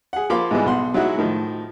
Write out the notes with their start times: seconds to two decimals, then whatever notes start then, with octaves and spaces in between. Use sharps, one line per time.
0.13 G#4 F#5
0.30 F3 A#3 F5 B5 C6 D6
0.51 G#2 B2 E3 G3 G#3
0.66 B1 F#5 C6
0.94 F#3 G#3 D#4 E4 F#4
1.18 A2 D#3 F3